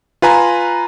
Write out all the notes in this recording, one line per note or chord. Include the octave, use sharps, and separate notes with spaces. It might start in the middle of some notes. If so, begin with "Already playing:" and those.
F4 B4 G#5 A#5